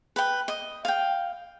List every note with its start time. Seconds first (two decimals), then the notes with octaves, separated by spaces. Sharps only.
0.16 B4 G5
0.48 D#5
0.85 F5 G5